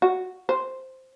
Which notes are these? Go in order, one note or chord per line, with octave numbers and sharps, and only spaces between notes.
F#4
C5